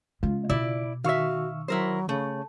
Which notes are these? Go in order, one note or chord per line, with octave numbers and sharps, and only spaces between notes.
C#3 G#3 C#4 F4
B2 E4 D5
D#3 F#4 E5 F5 C#6 E6
F#3 E4 A#4 C5
C#3 A3